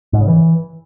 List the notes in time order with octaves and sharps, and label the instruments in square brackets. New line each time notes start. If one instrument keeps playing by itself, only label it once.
[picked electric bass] G#2
C#3
E3